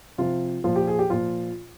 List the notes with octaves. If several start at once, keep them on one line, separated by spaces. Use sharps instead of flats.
C3 F3 F4
A#2 F3 F4
G4
G#4
G4
A#2 F3 F4